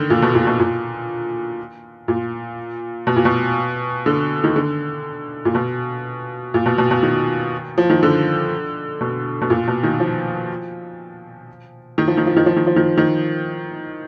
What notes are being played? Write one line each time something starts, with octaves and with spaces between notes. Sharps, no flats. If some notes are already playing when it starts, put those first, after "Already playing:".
Already playing: D3 D#3
A#2
B2
A#2
B2
A#2
A#2
B2
A#2
B2
D3
D#3
D3
A#2
B2
A#2
B2
B2
B2
D#3
F3
D#3
D3
B2
B2
A#2
B2
D#3
F3
D#3
F3
D#3
F3
D#3
F3
D#3
F3
D#3
D#3